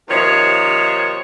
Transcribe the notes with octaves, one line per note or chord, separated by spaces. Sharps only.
D#2 C3 D#3 F3 C5 C#5